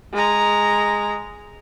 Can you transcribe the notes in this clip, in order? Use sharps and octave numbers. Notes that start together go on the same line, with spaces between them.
G#3 A#5